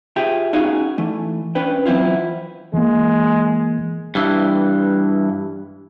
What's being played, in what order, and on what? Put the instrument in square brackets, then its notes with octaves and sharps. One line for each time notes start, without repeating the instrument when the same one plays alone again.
[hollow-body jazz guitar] F4 G4 G#4 E5 G5
C#4 D#4 F#4 G#4 F5 G#5
E3 A3
C#4 D4 B4 G5
E3 F#3 C4 E4 F4
[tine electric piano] E3 A#3 [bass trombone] G#3
[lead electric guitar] G2 E3